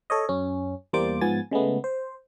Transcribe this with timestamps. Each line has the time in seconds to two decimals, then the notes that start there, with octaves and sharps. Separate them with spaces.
0.10 A4 C#5 D#5
0.29 F#2 C#4
0.93 E2 G3 A#3 C5 D5 D6
1.21 G#2 F3 B3 G#5 A6
1.51 C#3 G#3 A3 B3
1.84 C5